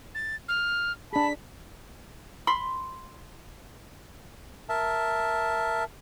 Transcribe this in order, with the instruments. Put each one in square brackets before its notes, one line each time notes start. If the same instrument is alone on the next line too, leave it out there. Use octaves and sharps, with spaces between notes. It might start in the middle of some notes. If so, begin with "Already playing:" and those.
[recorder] A6
F6
[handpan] D4 G#4 [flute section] A5 B5 [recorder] B6
[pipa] B5 C6
[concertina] A#4 E5 A5